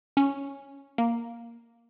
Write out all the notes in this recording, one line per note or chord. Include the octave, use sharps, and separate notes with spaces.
C#4
A#3